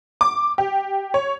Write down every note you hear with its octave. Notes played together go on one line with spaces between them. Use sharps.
D6
G4
C#5